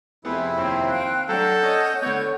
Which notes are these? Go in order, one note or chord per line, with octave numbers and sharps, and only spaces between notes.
F2 C3 B3 C4 E4 G#4
D#2 C4 C#5
F5 G5 F#6
F#3 D4 A4 F#5 A#5 G6
C#4 C#5 D#5 D#6
D3 B3 A4 C#5